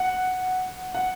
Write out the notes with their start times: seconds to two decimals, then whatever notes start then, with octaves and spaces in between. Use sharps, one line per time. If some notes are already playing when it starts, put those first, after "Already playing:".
Already playing: F#5
0.95 F#5